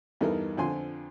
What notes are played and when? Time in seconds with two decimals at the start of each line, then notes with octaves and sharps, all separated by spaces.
0.21 E2 G2 D#4 A4 A#4
0.57 F2 D3 F3 G#5 C6